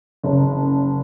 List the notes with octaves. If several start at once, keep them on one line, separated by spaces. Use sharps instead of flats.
F#1